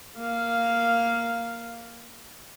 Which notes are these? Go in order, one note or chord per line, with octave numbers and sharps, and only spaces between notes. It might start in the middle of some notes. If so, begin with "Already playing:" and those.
A#3 F5